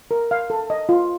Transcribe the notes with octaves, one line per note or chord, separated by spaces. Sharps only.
A#4
F5
A4
D#5
F4